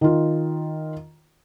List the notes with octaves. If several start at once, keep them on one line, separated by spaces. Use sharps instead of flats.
D#3 F4